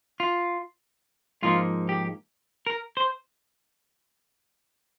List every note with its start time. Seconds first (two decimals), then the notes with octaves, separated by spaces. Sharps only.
0.20 F4
1.43 G#2 F3 A#3 D#4 F4
1.89 G4
2.67 A#4
2.97 C5